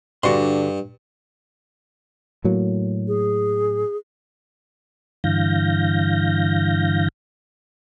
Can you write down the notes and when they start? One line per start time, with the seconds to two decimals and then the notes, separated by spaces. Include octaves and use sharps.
0.24 G2 D3 F#4 C6
2.44 A2 F#3 A#3
3.08 G#4
5.24 G2 D3 E3 F5 G6 A#6